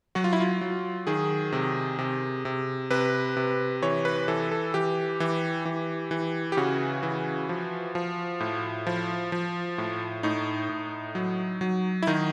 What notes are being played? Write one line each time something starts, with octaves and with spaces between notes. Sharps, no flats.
F#3 F#4
F4
E4
F4
F#3
D#3 G#4
C3
C3
C3
C3 B4
C3
E3 C#5
B4
E3 A4
A4
E3 G4
E3
E3
E3
G4
C#3 F#4
E3
F3
F3
A2
F3
F3
A2
A2 D#4
A2
F#3
F#3
E4
D#3 D#4